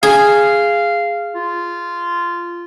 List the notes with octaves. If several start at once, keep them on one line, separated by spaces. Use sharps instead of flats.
G#4 F5
F4